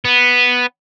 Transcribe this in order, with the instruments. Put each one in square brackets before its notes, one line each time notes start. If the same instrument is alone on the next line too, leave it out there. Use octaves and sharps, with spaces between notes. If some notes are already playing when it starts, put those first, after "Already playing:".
[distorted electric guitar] B3